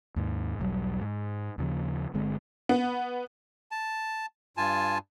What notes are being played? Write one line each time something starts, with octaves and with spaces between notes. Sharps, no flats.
D#2 G#2
E1 B1 F#3 G3
G#2
D#2 C#3 F3
G1 D3 G#3 C4
B3
A5
G2 F4 G#5 A5